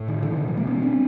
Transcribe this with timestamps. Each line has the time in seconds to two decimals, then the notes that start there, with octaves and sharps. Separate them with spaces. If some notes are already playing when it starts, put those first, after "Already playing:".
Already playing: A2
0.08 D#3
0.23 D3 E3
0.32 D#3
0.37 B2 D3
0.47 E3 F#3
0.57 G#3 A#3
0.67 B3 C#4
0.82 C4 D4